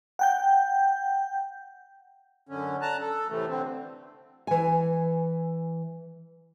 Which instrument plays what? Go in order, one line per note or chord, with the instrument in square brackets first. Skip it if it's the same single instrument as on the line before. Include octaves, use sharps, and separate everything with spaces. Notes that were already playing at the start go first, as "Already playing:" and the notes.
[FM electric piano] F#5 G5 G6
[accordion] F#2 D3 C#4
A5 A#5 F#6
A4
A2 C3 E3 A3
D3 C4
[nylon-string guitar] E3 G#5